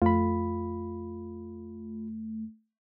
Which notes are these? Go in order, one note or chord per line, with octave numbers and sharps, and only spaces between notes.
F2 A3 F4 B5